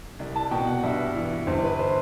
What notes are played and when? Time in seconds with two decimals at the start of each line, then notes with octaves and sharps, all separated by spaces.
0.19 C2
0.36 A5
0.51 B2 G5
0.67 F#5
0.83 G2 E5
1.15 E3
1.47 G1 C5
1.63 B4
1.79 C5